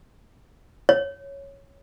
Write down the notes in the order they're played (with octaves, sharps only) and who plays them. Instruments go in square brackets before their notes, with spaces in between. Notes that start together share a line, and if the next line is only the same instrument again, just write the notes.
[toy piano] C#5